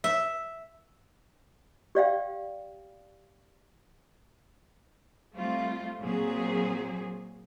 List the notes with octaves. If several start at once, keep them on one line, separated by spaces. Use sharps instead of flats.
E5
G4 D5 F5 G5
G3 A3 C4 F4
A#2 F#3 C4 G#4